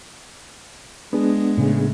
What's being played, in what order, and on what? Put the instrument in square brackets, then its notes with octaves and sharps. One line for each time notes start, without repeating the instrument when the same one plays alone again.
[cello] G#3 [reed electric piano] B3 D4 G#4
[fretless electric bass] A2 C#3